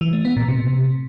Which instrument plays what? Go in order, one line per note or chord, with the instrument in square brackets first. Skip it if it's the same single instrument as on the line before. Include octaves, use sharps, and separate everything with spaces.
[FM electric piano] E3
A3
B3
A#2
C3